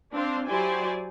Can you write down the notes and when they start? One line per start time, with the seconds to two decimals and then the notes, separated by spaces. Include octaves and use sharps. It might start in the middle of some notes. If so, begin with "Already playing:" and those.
0.12 C4 D4 C5 F5
0.46 F#3 E4 G4 C5 D5 G#5